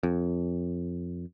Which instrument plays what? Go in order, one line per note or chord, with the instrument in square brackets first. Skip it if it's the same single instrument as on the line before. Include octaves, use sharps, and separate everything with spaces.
[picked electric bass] F2